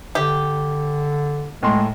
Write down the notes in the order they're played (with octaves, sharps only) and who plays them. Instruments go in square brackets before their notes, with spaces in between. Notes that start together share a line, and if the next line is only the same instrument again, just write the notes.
[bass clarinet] D3 [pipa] G4
[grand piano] A2 C6 [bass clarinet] G#3